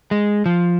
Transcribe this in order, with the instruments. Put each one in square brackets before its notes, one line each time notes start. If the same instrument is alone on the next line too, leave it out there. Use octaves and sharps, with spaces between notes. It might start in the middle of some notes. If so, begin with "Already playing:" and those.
[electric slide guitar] G#3
F3